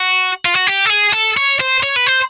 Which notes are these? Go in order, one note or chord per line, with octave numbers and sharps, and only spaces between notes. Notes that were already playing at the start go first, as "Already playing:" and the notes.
Already playing: F#4
F4
F#4
G4
A4
G#4
A4
C#5
C5
C#5
B4
C5